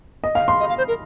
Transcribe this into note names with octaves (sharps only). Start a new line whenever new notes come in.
D#5
F5
C6
D#5
F5
C5
A#4